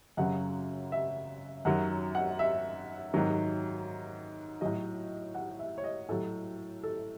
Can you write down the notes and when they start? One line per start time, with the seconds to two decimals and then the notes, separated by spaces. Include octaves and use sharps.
0.17 F#2 C#3 F#3 F#5
0.92 E5
1.65 F#2 D#3 F#3 F#5
2.15 F#5
2.39 E5
3.14 G#2 D#3 F#3
4.61 A2 F#3 D#5
5.35 F#5
5.59 E5
5.78 C#5
5.84 D#5
6.09 A2 F#3 A4
6.83 A4